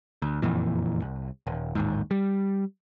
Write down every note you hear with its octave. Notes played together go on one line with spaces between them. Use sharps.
D2
F#1 F2 A#2 E3
C2
D#1
A1 D#2 G#2
G3